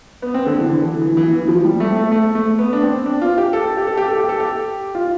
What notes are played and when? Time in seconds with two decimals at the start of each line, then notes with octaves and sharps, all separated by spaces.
0.22 B3
0.34 C4
0.46 D3
0.59 E3
0.69 D3
0.86 E3
1.02 E3
1.17 E3
1.33 E3
1.48 F3
1.65 G3
1.80 A3
1.96 A3
2.12 A3
2.35 A3
2.59 B3
2.73 D4
2.83 C4
3.06 D4
3.22 F4
3.38 G4
3.53 A4
3.77 G4
3.87 A4
3.97 G4
4.08 A4
4.19 G4
4.29 A4
4.40 G4
4.95 F4